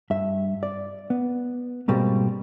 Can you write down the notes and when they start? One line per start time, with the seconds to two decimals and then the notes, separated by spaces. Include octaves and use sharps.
0.10 G2 E5
0.63 D5
1.10 B3
1.88 G#2 B2 G3 A#3 C4